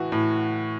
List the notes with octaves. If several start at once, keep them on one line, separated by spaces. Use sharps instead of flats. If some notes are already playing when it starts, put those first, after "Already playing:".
Already playing: A2 E3 F#4
A2